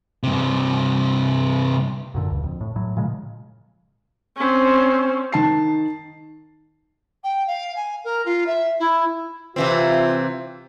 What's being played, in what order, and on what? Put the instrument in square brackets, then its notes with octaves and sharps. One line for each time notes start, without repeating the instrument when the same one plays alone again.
[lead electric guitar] G2 C3
[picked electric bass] F#2 A#2 D3
D1 C#2
F2
A2
A2 F#3
A#2 C#3 F3 G#3
[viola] C4 C#4
[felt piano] D#3 A5 C7
[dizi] G5
F5
G#5
A#4
F4
E5
E4
[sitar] C3 E3 C4 [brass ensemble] F4